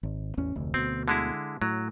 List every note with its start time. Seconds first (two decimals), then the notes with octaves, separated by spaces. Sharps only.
0.03 G#1
0.37 A1 E2 C#4
0.55 F1 D2
0.74 D2 B2 C4
1.08 D3 G#3 E4
1.62 A2 F#3